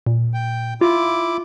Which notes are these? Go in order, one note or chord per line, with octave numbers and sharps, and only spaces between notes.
A#2
G5
E4 F4 D6